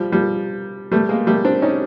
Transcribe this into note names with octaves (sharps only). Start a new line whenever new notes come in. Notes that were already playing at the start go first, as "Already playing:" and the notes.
Already playing: F3 G3
F3 G3
G3 A3
G#3 A#3
G3 A3
C4 D4
C#4 D#4